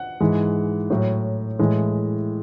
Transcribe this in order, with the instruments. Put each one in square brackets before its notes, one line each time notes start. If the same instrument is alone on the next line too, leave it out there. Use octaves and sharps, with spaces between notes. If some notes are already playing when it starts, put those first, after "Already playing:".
Already playing: [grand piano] F#5
G#2 E3 G#3
A2 F#3
A2 E3 G#3